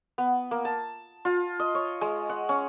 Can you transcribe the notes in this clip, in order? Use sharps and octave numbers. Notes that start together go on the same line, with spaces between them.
B3
A#3
A5
F4
D#5
C#5
G#3
F#5
C#4